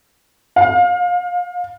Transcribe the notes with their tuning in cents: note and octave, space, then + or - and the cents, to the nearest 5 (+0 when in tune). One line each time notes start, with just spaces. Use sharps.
F5 +30